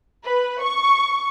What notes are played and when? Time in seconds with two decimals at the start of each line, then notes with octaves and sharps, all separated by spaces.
0.24 B4
0.62 C#6